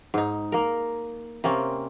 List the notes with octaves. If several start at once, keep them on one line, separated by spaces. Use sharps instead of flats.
G#2 D#4
A#3 A#4
C3 A#3 C4 C#4